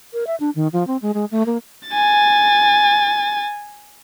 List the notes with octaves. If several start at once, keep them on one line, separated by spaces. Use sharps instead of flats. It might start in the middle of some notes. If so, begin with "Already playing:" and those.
A#4
E5
D4
D#3
F3
C4
G#3
G#3
A3
A#3
G#5 A6